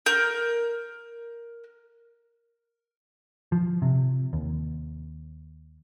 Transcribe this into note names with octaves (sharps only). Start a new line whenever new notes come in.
A#4 G6
F3
C3
D#2